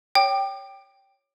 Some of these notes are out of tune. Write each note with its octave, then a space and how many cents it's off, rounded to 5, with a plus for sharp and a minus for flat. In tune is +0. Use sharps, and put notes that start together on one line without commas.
C#5 +5 G5 +0 D6 +40